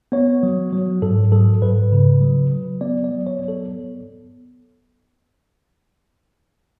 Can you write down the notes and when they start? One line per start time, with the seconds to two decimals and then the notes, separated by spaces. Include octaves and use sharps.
0.12 B3 C#5
0.43 F#3
0.73 F#3
1.02 G#2 A4
1.32 F#3 A4
1.62 G#2 B4
1.92 C#3
2.21 F#3
2.52 F#3
2.81 B3 D5
3.04 D5
3.11 F#3
3.27 C#5
3.41 B3
3.48 A4